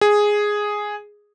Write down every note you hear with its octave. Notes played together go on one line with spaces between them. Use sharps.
G#4